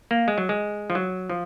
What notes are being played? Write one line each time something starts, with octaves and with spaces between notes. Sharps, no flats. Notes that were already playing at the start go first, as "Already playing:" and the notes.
A#3
G#3
F#3
G#3
F3
F#3
F3